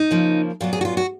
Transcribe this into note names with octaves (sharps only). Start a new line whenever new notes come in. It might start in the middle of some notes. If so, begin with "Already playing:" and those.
Already playing: D#4
C#3 F3 A#3
A#2 F#3 B3 F4
G#4
F#4
F4
F#4